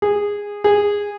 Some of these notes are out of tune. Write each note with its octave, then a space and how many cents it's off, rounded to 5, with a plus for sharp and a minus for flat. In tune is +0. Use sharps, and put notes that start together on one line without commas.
G#4 -15
G#4 -15